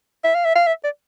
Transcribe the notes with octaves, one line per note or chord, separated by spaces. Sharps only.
E5
F5
E5
F5
E5
D5